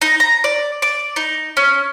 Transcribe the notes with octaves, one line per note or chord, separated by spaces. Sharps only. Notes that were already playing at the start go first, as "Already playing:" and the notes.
D#4
A#5
D5
D5
D#4
C#4